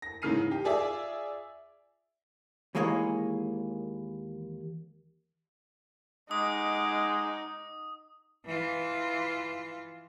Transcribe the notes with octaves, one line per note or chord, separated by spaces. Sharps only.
A#6
G#2 C#3 E3 F6 C7 D#7
G4
F4 G#4 D5 E5
D#2 E3 G#3 A#3 G#4 C#5
G#3 D#4 F#5 D6 D#6
E3 F4